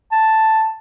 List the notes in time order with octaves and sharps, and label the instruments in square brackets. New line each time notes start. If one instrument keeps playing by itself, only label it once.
[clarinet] A5